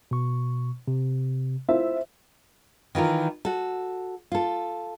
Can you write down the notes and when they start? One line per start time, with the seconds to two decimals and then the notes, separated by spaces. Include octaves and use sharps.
0.11 B2 C#6
0.88 C3
1.69 E4 F4 C5 E5
2.95 D#3 E3 F4 A#4
3.45 F#4 A4
4.32 F4 A4